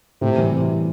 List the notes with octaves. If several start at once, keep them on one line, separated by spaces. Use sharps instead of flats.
A2 C3
E3 G3